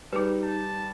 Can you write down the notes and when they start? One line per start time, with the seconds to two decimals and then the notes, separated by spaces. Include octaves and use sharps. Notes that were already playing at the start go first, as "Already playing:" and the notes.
0.13 G3 D#4 G#4 B4
0.43 A5